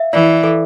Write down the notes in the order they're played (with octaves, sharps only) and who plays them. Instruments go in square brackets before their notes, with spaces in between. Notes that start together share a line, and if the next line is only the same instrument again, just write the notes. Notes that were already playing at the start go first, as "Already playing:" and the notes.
Already playing: [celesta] E5 F5
[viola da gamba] E3 [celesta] D5
[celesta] A4